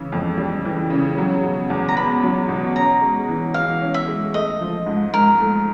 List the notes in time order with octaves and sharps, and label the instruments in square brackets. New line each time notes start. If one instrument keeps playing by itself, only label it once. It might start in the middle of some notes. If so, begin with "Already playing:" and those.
Already playing: [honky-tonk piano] C#3 E3
F2
G3
E3
C#3
F#3
B2
E2
[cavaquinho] A#5
[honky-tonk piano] B3 [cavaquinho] B5
[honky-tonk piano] F#3
B2
[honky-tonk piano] C#4 [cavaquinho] A#5
[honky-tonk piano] G#3
E3
[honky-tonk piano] E3 [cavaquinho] F5
[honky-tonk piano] C#4
[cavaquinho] E5
[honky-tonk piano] G#3
[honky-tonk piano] A3 [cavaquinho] D#5
[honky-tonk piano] F3
G#2
[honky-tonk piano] G#2 [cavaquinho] A#4
[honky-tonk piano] A3